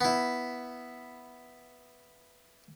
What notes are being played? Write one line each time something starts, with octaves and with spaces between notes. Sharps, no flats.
B3 E4